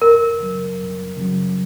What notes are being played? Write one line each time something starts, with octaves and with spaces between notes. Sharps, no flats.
F#2 A#4
C#3 F#3
F#2
C#3 F#3